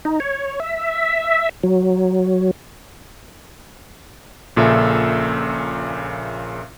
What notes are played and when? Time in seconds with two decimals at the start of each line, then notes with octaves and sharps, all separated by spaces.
0.05 D#4
0.20 C#5
0.60 E5
1.64 F#3
4.57 A#1 A#2 C#3 C#4 A4 E5